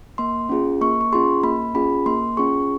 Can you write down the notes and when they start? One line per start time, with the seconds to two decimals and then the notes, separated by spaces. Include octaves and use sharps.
0.18 A#3 C6
0.49 C#4 F4 G#4
0.81 A#3 C#6
1.01 C#6
1.13 C#4 F4 G#4 C6
1.44 A#3 B5
1.74 C#4 F4 G#4 B5
2.06 A#3 C6
2.37 C#4 F4 G#4 C#6